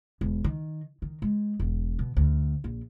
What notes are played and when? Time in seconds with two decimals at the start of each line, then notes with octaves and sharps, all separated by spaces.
0.21 E1
0.44 D#3
1.02 D#3
1.22 G#3
1.60 E1
1.99 B2
2.17 D2
2.64 A#1